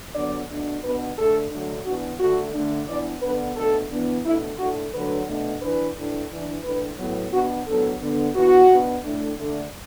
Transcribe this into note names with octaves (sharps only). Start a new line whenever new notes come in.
D3 F#3 B3 D4 D5
B2 A3 D4
B2 B3 D4 B4
D3 A3 D4 A4
D3 F#3 A3 D4
E3 B3 D4 F#4
D3 A3 D4 F#4
D3 A3 D4
E3 B3 D4 D5
D3 B3 D4 B4
B2 A3 D4 A4
E3 B3 D4
B2 A3 D4 E4
A2 A3 D4 F#4
D3 F#3 A3 D4 B4
B2 A3 D4
E3 D4 B4
A2 E3 D4
E3 D4
A2 E3 D4 B4
A2 F#3 B3
B2 B3 D4 F#4
A2 F#3 B3 D4 A4
D3 B3 D4
E3 B3 D4 F#4
B2 B3 D4
A2 A3 D4
D3 A3 D4